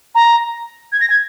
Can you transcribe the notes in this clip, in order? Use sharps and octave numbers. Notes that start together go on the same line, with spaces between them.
A#5
G#6
A#6
G#6